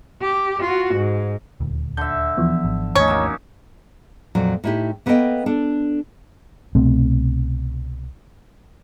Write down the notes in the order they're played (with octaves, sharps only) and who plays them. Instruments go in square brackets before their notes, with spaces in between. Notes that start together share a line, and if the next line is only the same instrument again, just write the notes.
[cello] G4
F4 F#4
G#2
[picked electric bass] D#1 D2
[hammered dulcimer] D3 E5 [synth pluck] G6
[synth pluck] E3 F3 B3
[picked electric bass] G#1
[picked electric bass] G#1 D#2 A3 [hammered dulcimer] C#4 D#4 [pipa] C#5
[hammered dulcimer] F#3 A#3
[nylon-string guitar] F2 A#2 F#3
A2 D#4 E4 F#4 G4
A#3 B3 A4 C5 D#5 G5
D4 A4
[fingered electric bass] C2 B2 A3 C4